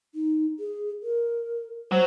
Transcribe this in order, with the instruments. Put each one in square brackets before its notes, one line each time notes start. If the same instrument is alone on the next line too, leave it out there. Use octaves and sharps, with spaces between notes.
[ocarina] D#4
G#4
A#4
[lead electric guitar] F#3 [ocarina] C5